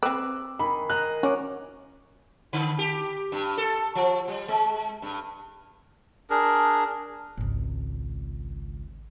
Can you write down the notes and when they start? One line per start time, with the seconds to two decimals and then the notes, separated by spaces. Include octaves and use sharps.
0.03 C4 B4 D6 E6 F#6
0.59 D#3 G#4 B5
0.90 D#5 A#5 F#6
1.23 C#4 F#4 D6
2.53 D3
2.79 G4
3.32 G2
3.57 A4
3.95 F3
4.28 G3
4.48 G#3
5.02 G2
6.30 D4 G#4 A#4
7.37 G#1 C#2